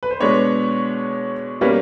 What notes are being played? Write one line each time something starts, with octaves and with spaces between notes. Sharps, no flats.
B4
C5
B2 G#3 B3 D4 B4 C#5
B2 G3 A#3 C#4 B4 C#5